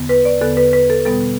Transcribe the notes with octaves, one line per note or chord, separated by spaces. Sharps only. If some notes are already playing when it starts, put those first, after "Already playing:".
Already playing: E2 D3 B3
B4
D5
E2 D3 B3 A4
B4
B4
A4
B2 G3 B3 A4